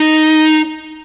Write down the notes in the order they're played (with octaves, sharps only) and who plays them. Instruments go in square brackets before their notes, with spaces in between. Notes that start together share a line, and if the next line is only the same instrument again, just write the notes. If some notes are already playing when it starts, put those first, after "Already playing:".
Already playing: [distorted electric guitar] D#4